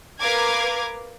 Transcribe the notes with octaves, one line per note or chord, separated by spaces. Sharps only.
A#4 B4 F5 D6 G#6